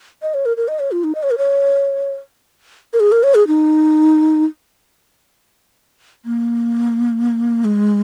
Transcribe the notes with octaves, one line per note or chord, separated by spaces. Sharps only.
D#5
C#5
A#4
A#4
D#5
C#5
F4
D#4
D#5
C#5
A#4
C#5
A#4
G#4
A#4
C#5
G#4
D#4
A#3
G#3